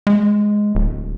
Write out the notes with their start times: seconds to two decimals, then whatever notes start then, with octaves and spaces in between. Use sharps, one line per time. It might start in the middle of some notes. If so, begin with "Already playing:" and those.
0.07 G#3
0.75 D1